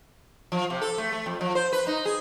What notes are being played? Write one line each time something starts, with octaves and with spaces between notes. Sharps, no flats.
F3
C3
A4
A3
A3
F2
F3
C5
B4
D#4
G#4